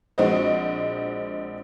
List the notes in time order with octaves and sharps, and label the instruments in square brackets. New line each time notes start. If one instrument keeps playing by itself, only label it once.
[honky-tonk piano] A#1 G#3 C4 F#4 C5 D#5